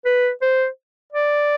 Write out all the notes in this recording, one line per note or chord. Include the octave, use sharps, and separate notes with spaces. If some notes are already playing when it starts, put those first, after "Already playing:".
B4
C5
D5